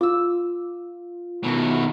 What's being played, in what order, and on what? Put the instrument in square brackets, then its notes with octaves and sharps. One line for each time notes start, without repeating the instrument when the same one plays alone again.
[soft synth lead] F4 [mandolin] D6 E6
[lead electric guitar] B2 D#3 [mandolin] E4 F#4